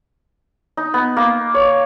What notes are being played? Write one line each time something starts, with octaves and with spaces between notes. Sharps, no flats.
D#4
B3
A#3
C#5